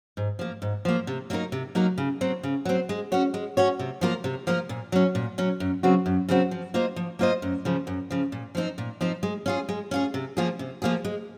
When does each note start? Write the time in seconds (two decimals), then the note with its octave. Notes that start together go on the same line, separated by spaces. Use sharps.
0.17 G#2
0.39 F3 A#3
0.62 G#2
0.85 F3 A#3
1.07 C3
1.30 F#3 A#3 D#4 A#4
1.52 C3
1.75 F#3 A#3 D#4 A#4
1.98 C#3
2.21 F#3 C4
2.43 C#3
2.65 F#3 C4
2.89 G#3
3.12 C#4 F#4 C#5
3.34 G#3
3.57 C#4 F#4 C#5
3.79 C3
4.01 F3 A#3 F4 A#4
4.24 C3
4.47 F3 A#3 F4 A#4
4.69 A#2
4.92 F#3 C#4
5.15 A#2
5.38 F#3 C#4
5.60 F#2
5.83 C#3 F#3 C4 F#4
6.06 F#2
6.29 C#3 F#3 C4 F#4
6.51 F3
6.74 A#3 F4 C5 D#5
6.96 F3
7.19 A#3 F4 C5 D#5
7.42 F#2
7.65 C#3 F3
7.87 F#2
8.11 C#3 F3
8.32 A#2
8.55 F3 C4 D#4
8.78 A#2
9.01 F3 C4 D#4
9.23 G#3
9.46 C#4 F4 G#4
9.69 G#3
9.91 C#4 F4 G#4
10.14 C3
10.37 F3 A#3 F4 G#4
10.59 C3
10.82 F3 A#3 F4 G#4
11.05 G#3